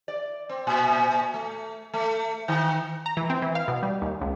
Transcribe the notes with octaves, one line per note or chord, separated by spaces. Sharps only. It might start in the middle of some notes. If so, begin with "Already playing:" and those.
D5
C4
A#2
A3
A3
D#3
A#5
E3
C4
E3
F5
B2
G3
D#2
C#2